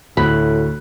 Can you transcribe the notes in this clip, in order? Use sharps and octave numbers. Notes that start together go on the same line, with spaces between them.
D2 A2 F#4 B5 F#6